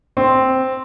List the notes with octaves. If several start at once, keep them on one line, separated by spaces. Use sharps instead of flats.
C4